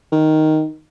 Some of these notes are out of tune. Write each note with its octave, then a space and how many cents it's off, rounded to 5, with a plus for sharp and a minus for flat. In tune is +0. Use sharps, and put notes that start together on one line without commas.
D#3 +0